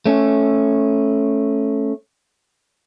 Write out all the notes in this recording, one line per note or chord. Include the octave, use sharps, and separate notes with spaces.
A3 C#4